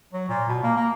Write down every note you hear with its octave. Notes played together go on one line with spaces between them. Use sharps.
F#3
A#2
B2
A#3
A#3